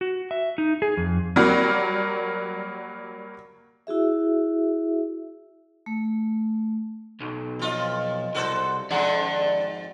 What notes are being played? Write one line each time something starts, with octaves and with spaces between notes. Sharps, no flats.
F#4
E5
D#4
G#4
F2
F#3 G3 A#3 F#4
E4 F#4 G#4 E5
A3
B1
F2 F4 D#5
C2 F#4 A4 C5
F2 G#2 F#4 D5 F#5